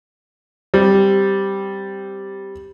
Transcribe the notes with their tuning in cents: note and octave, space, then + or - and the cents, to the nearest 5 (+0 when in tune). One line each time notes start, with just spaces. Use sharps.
G3 +0 C4 +0